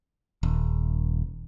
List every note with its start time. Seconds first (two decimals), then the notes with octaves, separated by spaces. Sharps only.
0.43 D#1